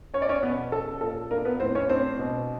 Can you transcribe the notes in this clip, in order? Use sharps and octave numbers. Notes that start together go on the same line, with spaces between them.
C#4 C#5
D5
C#4 C#5
B2 B3 B4
C#4 A4
A#2 A4
A#3 D4 A#4
B3 B4
A2 C4 C5
C#4 C#5
C4 D4 C5
B2